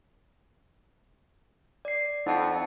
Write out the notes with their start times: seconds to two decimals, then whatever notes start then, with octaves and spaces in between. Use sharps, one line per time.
1.85 D5 C7
2.26 F2 D#4 F#5 A5